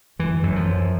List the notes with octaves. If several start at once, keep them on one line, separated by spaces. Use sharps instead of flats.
F#2 E3
F#2
F3
F#2